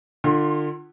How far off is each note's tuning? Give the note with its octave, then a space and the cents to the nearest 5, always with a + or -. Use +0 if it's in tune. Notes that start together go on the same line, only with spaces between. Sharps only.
D3 +35 F4 +0 C6 +30